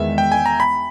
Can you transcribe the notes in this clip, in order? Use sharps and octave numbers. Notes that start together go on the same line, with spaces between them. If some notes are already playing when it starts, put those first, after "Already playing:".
Already playing: E2 D#3 G#3 B3 E5
G5
G#5
A#5
B5